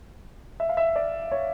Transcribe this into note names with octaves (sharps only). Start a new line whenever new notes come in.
E5
F5
E5
D5
C#5